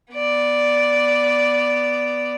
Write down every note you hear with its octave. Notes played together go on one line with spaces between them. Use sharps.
B3 D5